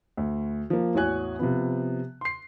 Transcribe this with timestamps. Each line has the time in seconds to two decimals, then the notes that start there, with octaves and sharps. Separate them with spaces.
0.17 D2
0.70 F3 A#3
0.94 A1 E2 F#4 C#5 G#5 F#6
1.39 C3 F3 B3
2.21 C6 C7